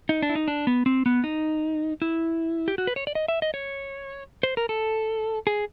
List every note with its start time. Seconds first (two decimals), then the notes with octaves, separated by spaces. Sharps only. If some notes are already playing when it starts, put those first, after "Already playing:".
0.09 D#4
0.23 D4
0.29 E4
0.35 D#4
0.48 D4
0.67 B3
0.86 C4
1.06 B3
1.24 D#4
2.02 E4
2.68 G4
2.78 F#4
2.87 B4
2.96 C#5
3.07 D5
3.15 D#5
3.28 E5
3.42 D#5
3.54 C#5
4.43 C5
4.57 A#4
4.69 A4
5.47 G#4